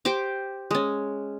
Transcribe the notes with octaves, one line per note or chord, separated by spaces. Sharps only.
G4 C5 D6
G#3 C#4